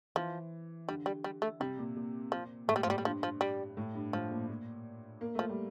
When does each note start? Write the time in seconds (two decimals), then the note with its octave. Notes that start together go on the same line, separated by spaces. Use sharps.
0.16 E3 F3
0.88 D3 G3
1.06 G3
1.24 G3
1.42 A3
1.60 C3 G3
1.79 A#2
1.96 A#2
2.32 F3
2.68 A2 A3
2.76 G3
2.83 F3
2.87 A2 G3
2.98 G3
3.05 G2 F3
3.23 F3
3.41 G3
3.77 A2
3.95 G2
4.13 A2 F3
4.31 A#2
4.49 A#2
5.21 A#3
5.35 F3 A3
5.49 G3